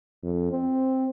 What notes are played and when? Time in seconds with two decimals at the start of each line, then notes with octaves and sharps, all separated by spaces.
0.23 F2
0.52 C4